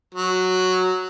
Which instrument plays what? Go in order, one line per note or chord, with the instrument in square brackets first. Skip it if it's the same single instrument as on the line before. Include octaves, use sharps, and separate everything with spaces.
[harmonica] F#3